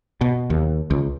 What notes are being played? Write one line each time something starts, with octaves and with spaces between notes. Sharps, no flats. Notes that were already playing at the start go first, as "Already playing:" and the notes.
B2
D#2
C#2